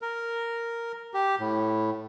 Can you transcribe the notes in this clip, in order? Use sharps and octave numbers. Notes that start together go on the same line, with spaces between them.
A#4
G4
A2